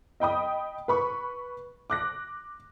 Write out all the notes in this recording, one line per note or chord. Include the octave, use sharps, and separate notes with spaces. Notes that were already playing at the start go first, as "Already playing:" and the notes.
D#5 G5 B5 D#6
B4 B5 C#6
D6 F#6 A#6